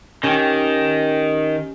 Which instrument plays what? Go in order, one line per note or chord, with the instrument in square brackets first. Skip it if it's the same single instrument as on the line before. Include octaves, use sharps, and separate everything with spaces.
[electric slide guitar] D#3 [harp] C#4 G4